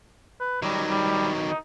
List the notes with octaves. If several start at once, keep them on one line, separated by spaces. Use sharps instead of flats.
B4
D#3 F#3 G3
G3
D#4